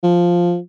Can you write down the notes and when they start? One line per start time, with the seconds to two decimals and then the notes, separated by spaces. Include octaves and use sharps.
0.03 F3